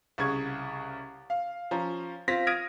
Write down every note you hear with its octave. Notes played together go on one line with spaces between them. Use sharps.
C2 C#3 C#6 G#6
F5
F3 C#4 A#5
C4 F4 A#6 B6
D#6 F6 G#6 A#6 D7 D#7